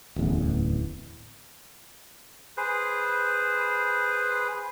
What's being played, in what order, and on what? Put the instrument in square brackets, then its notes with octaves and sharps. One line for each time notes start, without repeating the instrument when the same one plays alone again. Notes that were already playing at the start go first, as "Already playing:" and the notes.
[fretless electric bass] D1 A1 E2
[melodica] G#4 B4 C5